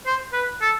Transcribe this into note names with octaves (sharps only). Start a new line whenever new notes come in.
C5
B4
A4